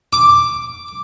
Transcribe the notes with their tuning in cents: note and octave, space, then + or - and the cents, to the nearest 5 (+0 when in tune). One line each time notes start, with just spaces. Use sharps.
D6 +0